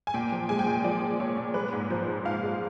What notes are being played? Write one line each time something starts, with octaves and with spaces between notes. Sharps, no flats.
G#5
A#2 G5
F3
G#3 G#5
G5
A#2 G#5
F3 D5
F3
A#2 C#5
A#2
G#3 B4
G#2
F3 C5
G#2
G#2 F5
G#3